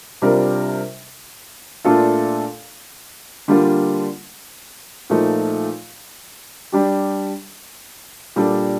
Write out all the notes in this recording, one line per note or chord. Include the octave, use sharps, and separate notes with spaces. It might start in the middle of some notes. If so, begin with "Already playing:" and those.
C3 G3 D4 F4 A#4
A#2 A3 D4 F4 A4
D3 G3 A#3 D4 F4
A#2 F3 A3 D#4
G3 D4 G4
A#2 G3 D4 A4